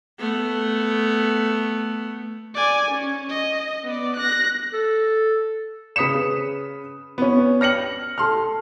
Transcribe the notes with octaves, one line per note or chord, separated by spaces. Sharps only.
A3 B3
D5 G#5
C#4
D#5
B3 D5
F#6 A#6
A4
C#3 B4 D#6 B6 C#7 E7
B3 C#4
F6 A#6 C#7 F#7
A4 C6 F6